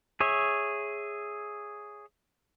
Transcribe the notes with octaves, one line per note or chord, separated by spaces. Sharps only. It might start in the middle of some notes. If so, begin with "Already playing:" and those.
G#4 C#5 E5